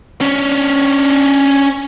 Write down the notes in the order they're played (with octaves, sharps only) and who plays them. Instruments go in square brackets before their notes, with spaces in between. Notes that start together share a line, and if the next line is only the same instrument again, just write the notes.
[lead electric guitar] C#4 D4